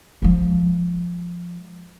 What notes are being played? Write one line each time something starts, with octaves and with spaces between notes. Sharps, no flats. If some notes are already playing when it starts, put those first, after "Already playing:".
F3 G#3